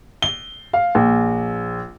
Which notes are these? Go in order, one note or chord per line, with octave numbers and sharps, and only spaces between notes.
G7
F5
A#1